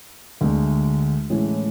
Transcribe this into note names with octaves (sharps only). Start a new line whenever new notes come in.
D2 D3 G#3
A2 E3 G#3 C#4